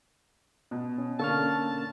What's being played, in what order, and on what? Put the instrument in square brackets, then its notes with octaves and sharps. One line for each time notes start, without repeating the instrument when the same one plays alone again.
[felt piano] B2
[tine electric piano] C#4
[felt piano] D3 [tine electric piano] A#3 C#6 F6 [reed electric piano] C#4 [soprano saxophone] A5